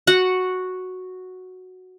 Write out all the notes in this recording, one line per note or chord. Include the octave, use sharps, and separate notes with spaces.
F#4 F#5